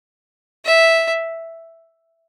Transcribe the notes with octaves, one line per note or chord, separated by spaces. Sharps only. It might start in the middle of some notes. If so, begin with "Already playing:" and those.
E5